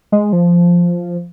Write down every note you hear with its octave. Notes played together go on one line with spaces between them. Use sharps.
G#3
F3